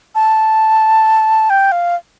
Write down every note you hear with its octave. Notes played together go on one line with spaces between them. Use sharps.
A5
G5
F5